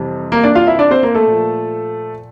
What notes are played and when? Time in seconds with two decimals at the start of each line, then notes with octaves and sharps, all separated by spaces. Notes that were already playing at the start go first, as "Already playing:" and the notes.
Already playing: F2 C3 E3 G3
0.32 A#3 A#4
0.44 D4 D5
0.55 F4 F5
0.67 E4 E5
0.79 D4 D5
0.91 C4 C5
1.03 A#3 A#4
1.14 A3 A4
1.26 A#2 F3